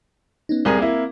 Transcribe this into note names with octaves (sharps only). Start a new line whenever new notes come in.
B3 C#4 D#4
C2 C4 G#4 A#4
A#3 E4